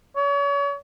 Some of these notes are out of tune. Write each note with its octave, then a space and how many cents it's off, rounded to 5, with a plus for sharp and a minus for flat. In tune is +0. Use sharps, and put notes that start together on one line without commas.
C#5 +35